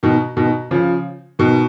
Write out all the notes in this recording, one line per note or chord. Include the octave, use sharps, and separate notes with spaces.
B2 D#3
B2 D#3
C#3 F3
B2 D#3